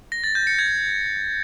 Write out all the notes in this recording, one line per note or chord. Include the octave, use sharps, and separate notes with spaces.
A#6
A6
G6
C#7
G#6